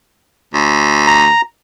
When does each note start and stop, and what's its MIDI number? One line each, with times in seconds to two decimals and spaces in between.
0.54 1.28 38
1.07 1.41 82